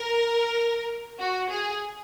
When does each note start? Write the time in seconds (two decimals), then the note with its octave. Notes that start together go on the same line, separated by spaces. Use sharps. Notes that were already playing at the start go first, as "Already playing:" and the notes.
Already playing: A#4
1.19 F#4
1.50 G#4